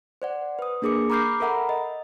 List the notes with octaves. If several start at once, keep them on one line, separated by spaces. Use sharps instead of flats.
C5 D5 F#5
B4 D#6
A#3 D4 G#4 A#4 D6 C#7
A#5 B5 D6 F6 G6 C7
A4 A#4 E5 F#5 A#5 B5
D#5